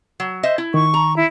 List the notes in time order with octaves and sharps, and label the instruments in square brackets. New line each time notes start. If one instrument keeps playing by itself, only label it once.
[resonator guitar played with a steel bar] F#3
C5 D#5 E5
E4
[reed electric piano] D#3 [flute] C#6
[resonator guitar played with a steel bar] A#5
[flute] E4